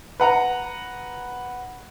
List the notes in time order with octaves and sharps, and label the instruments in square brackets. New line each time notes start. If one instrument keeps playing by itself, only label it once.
[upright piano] B4 F#5 A#5